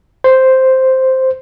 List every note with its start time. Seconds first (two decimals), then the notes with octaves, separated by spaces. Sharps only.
0.24 C5